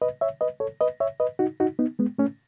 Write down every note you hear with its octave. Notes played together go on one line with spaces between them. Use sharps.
B4 D#5
C#5 E5
B4 D#5
A4 C#5
B4 D#5
C#5 E5
B4 D#5
D#4 F#4
D#4 F#4
B3 D#4
G#3 B3
A3 C#4